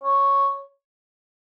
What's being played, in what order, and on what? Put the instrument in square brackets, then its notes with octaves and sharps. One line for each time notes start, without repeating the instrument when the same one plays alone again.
[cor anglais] C#5